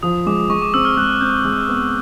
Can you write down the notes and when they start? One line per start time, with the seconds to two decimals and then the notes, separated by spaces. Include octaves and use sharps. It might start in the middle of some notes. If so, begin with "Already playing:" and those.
0.03 F3 D#6
0.26 G#3 D6
0.50 G#3 C#6
0.62 D6
0.74 C4 E6
0.85 F6
0.97 G#3 F#6
1.21 C4 G6
1.45 G#3
1.68 B3